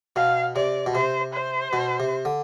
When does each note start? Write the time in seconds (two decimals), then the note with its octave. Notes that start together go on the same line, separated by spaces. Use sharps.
0.16 B2 F5
0.56 C3 D5
0.86 B2
0.94 C3 C5
1.34 C5
1.73 B2
2.00 C3
2.25 D3